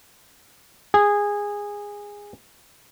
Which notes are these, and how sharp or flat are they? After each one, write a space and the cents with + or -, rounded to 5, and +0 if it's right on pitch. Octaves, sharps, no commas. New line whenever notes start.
G#4 -15